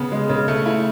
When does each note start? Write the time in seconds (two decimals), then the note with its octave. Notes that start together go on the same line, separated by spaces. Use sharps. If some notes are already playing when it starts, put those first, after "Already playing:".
Already playing: C#3 B3
0.12 G#3
0.29 C#3
0.48 A3
0.66 E4